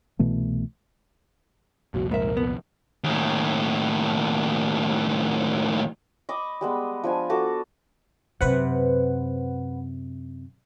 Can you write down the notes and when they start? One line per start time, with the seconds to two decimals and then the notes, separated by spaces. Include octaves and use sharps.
0.19 C2 B2 E3 A3
1.94 C2 F2 A#2 F#4
2.11 G#2 A#4 E5
2.37 B3
3.04 D#2 A2
6.29 D#5 B5 C#6 D6
6.61 G3 G#3 B3
7.04 F3 D4 G#5
7.30 F#4 A4 D6
8.41 F#2 C3 B4 C5 F#5